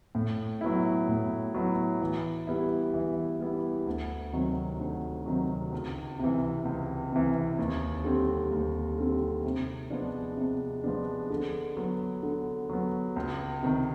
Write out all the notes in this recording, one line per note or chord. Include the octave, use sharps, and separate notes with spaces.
A2
F#3 B3 E4
A2
F#3 B3 E4
E3
G3 B3 E4
E3
G3 B3 E4
D2
C3 D#3 F#3
D2
C3 D#3 F#3
C#2
C3 E3
C#2
C3 E3
D#2
D3 G3 C4
D#2
D3 G3 C4
C3
F3 G#3 B3 D4
C3
F3 G#3 B3 D4
D3
F#3 B3
D3
F#3 B3
C#2
C3 D#3